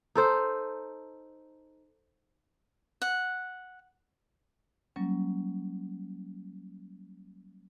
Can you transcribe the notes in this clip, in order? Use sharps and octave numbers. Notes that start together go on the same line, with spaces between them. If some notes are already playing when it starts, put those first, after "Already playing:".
D#4 A4 C5
F#5
F#3 G3 A#3 C#4